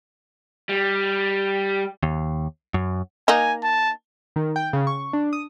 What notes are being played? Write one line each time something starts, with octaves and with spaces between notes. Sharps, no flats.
G3
D#2
F#2
A#3 D#4 G#5
A5
D#3
G5
C#3
C#6
D4
D#6